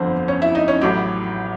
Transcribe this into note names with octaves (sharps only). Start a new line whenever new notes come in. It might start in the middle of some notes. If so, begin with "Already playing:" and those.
Already playing: G1 F2 D3 F3 C4 C5
C#4 C#5
E4 E5
D#4 D#5
C#4 C#5
A1 A2 F#3 G4